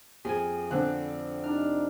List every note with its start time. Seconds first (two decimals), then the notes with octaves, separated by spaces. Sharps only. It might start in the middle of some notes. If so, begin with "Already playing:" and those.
0.25 F2 G#4 G#5
0.71 D3 C4 D4 F#6
1.44 C3 D4 D#4 F6